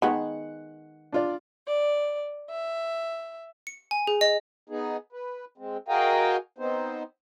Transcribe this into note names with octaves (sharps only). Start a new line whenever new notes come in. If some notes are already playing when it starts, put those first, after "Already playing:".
D#3 G#3 B3 F#5
D4 F4 D5
D5
E5
C#7
G#5
G#4
D#5
B3 D#4 G#4
B4
G#3 C4
F#4 G#4 A#4 D#5 F5 G5
B3 C4 D#4 C5